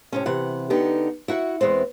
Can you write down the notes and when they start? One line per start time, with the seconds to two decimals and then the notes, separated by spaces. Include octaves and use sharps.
0.12 A2 C3 C#4
0.26 C3 E3 F#5
0.70 D3 B3 D#4 G4
1.28 E4 F#4 F5 F#5
1.61 E2 G#3 B3 C4